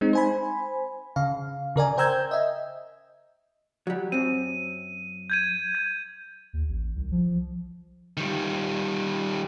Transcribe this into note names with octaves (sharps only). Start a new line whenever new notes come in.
G#3 C4 D#4
C5 G#5 B5
C#3 F5
C#3 A#4 D5 G#5
C5 G5 A#5 E6 G6 G#6
D#5 E5
F#3 G3
F#2 C4 D#7
G6 G#6 D#7
G#6
D#2
A1
C2
F3
D#3 G3